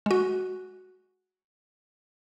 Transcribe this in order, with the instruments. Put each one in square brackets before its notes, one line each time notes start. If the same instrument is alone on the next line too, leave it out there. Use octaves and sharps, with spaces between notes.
[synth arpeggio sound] G#3 F#4